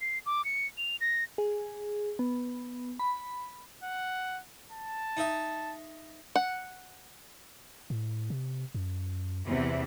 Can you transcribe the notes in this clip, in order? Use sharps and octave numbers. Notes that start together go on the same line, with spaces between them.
C7
D6
C#7
F7
A#6
G#4
B3
B5
F#5
A5
D#4 D#5 E5
F#5
A2
C3
F#2
E2 C3 E3